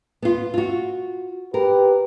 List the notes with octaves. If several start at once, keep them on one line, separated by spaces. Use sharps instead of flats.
B3 F4
F4 F#4
G4 A#4 B4